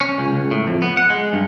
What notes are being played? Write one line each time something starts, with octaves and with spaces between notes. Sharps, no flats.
C#4
C#2
C#2
A2
F2
B3
F#5
G#3
G2